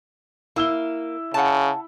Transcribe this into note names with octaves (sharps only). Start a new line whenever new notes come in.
A#3 E4 E6 G7
C#3 F#5 A5